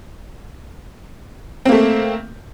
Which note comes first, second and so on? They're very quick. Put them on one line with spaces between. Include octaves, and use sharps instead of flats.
C4 A#3 A3